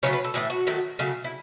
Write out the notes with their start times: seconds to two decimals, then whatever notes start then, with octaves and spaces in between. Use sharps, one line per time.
0.03 C#3 F#3 A3 C#5
0.13 B4
0.24 A4
0.34 A2 E3 A3 G#4
0.50 F#4
0.67 D#3 F#3 A3
0.99 C#3 F#3 A3
1.24 E4